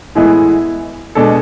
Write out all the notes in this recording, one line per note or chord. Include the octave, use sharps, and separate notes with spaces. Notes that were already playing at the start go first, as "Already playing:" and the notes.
A2 E3 G#3 B3 E4
B2 G#3 D4 A4